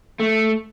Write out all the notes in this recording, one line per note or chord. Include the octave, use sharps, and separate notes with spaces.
A3